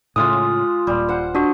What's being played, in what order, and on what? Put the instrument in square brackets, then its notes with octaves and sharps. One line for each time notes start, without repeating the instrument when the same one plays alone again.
[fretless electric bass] A2 C#3 [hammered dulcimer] G#3 F4 G4 [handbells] D#6
[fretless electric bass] D#1 A#2 [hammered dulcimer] G3
[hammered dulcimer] C5 F#5
[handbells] D4 F#4 [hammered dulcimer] D#5